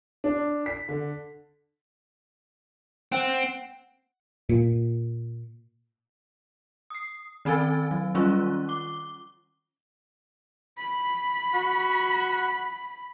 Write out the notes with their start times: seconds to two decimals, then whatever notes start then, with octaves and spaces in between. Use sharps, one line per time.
0.24 D4
0.66 B6
0.89 D3
3.12 C4 F#5
4.49 A#2
6.90 D#6 C7
7.45 D#3 C4 A4 G#5 E6 A6
7.91 F#3
8.15 D#3 G3 C#4 F4 C#6 F#6
8.69 D6 G7
10.77 B5
11.54 F#4